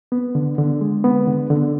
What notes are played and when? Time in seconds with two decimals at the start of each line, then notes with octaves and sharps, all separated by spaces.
0.12 B3
0.35 D3
0.58 D3
0.81 G#3
1.04 B3
1.27 D3
1.50 D3